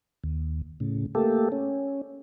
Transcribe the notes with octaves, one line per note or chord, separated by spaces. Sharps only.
D#2
A2 C#3
A3 A#3 G4 A4
C#4